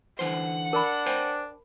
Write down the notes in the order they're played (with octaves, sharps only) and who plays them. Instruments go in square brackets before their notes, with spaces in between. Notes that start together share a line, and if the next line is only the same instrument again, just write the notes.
[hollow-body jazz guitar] D3 E3 C5 [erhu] F#5
[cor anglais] D4 [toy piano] A#4 B5
[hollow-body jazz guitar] C5 G5 G#5